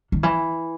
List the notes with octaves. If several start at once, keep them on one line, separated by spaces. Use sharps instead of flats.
D#3
E3